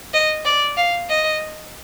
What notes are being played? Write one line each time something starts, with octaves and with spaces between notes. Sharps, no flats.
D#5
D5
F5
D#5